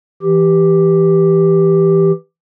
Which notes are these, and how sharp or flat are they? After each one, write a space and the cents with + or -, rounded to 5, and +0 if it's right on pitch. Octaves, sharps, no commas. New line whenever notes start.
E3 +0 G4 +0